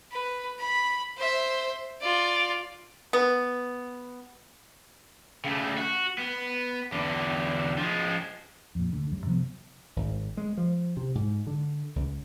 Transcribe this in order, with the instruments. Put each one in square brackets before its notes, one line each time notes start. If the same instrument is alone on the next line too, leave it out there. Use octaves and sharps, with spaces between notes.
[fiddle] B4
B5
C5 E5
F4 D5
[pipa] B3
[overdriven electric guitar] C#3 A3
F#4
B3
E2 D3
F3 G#3
[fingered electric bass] F2 A#2
D2 D3
F#2 G3
C3 F3 A3 B3
[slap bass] G#1
G#3
F3
C3
G#2
D3
C#2